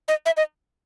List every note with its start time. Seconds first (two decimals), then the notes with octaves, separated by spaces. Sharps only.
0.08 D#5
0.26 E5
0.37 D#5